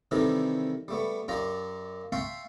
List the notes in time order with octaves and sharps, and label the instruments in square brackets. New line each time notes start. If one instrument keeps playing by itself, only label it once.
[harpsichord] C3 D#3 E3 G3 A4 A#4
G3 A3 B3
F#2 F4 G4 D5 A#5
E5 F5 G5 A5 C6 C#6